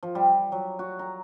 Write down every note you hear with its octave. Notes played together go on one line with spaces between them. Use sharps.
F3
G3
F#3
F#4
A#5